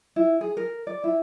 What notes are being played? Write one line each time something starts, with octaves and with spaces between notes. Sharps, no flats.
E4
G#4
A#4
D5
E4